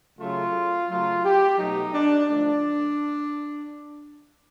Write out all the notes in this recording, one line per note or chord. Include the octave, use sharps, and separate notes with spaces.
C#3 F#3 A3 F4
C#3 F#3 A3 F4
G4
B2 F#3 A3 D#4
D4
D3 F3 A3 D4